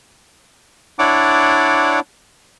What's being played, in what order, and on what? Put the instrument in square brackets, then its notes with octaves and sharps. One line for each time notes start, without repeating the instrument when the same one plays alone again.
[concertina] D4 E4 C#5 D5 F#5 D6